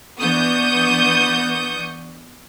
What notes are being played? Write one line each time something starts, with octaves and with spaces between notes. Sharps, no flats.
E3 B3 D4 C#6 D#6 G6